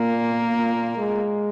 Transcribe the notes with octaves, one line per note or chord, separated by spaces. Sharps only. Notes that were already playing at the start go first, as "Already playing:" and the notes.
Already playing: A#2 A#3
A#2
G#3